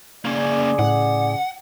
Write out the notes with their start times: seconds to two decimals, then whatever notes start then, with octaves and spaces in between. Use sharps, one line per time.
0.25 C#3 A#3 C#4 G#4 D5
0.79 A2 F#5